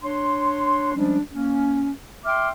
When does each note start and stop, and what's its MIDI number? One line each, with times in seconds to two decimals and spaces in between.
0.03 0.92 62
0.03 0.92 73
0.03 0.92 84
0.95 1.19 53
0.95 1.19 55
0.95 1.19 56
0.95 1.19 61
0.95 1.19 62
1.32 1.89 58
1.32 1.89 61
2.26 2.49 76
2.26 2.49 79
2.26 2.49 84
2.26 2.49 86
2.26 2.49 89